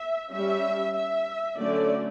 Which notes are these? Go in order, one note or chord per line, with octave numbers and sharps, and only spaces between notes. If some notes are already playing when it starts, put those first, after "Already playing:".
Already playing: E5
G3 C#4 E5
E5
D3 F#3 A3 C#4 D5